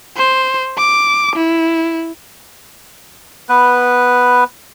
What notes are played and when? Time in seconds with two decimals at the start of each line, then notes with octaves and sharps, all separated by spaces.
0.17 C5
0.78 D6
1.36 E4
3.49 B3 B4